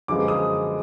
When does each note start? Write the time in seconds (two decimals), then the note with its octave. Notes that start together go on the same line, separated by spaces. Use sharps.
0.08 F#2 D3 F3 G#3 B3 D6
0.28 D#6